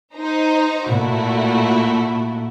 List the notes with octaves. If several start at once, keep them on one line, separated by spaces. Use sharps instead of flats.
D#4 C5 A#5
A#2 A3 E4 F#4